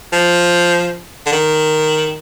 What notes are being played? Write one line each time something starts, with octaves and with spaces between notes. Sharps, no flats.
F3
D3
D#3